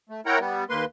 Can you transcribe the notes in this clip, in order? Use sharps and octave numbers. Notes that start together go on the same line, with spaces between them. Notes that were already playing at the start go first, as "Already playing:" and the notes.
A3
E4 A#4 C#5 F#5 G5 A#5
G3 B3
D#2 A#3 B4 C6